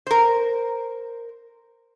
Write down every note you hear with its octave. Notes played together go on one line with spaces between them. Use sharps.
A#4 C5